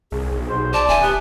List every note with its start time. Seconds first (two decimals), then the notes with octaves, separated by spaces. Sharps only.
0.12 C2 G#4
0.32 B1
0.49 C5
0.74 D5 A5
0.88 D#1 E5 G#5
1.02 B3 G4